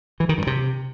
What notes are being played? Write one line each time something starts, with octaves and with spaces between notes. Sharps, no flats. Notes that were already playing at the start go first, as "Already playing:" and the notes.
E3
D#3
G2
C3